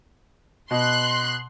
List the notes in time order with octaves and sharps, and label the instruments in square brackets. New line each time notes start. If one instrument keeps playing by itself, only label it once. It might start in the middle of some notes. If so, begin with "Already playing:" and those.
[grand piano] B2 [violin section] C6 F#6